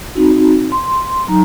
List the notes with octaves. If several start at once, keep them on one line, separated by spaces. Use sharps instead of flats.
C4 D#4 F#4
C6
F#3 D#4 A#5